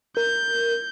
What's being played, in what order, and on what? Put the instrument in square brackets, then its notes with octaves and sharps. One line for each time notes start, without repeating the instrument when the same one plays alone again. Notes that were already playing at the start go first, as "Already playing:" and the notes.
[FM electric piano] A#4 [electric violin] G6